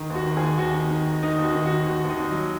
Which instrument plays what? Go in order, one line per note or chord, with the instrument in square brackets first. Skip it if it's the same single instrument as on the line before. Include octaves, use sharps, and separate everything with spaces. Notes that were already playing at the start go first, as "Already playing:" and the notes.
Already playing: [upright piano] D#3
D#2 F#4
D#3
G#4
D#2
D#2 F#4
D#3
D#3
D#3
D#3 D#4
D#2
F#4
D#3
F#4
D#3
D#2 F#4
D#2
D#4
D#2
F#3